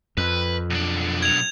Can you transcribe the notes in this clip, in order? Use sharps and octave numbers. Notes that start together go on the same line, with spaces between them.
F2 B4
B1 D4
G#6 F7